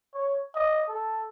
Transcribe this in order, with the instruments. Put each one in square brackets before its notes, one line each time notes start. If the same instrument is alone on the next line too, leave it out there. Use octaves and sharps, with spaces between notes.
[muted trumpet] C#5
D#5
A4